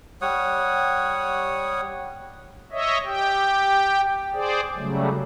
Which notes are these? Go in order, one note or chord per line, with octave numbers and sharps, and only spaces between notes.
G3 C#5 F#5 D#6
C#5 D#5 E5
G4 G5
G#4 C5 D5
C#3 F#3 G3 A3